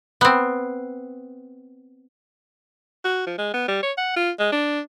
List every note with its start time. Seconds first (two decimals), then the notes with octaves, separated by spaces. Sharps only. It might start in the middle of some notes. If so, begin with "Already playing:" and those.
0.21 B3 C4
3.04 F#4
3.27 F3
3.38 G#3
3.54 B3
3.68 G3
3.83 C#5
3.97 F#5
4.16 F4
4.39 G#3
4.52 D4